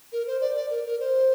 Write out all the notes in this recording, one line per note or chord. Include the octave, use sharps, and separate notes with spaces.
A#4
C5
D5
D5
A#4
A#4
C5